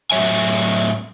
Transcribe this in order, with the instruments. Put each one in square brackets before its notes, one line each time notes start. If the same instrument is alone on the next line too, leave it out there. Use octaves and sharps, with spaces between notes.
[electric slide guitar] A2 F#3 C#5 E5 G#5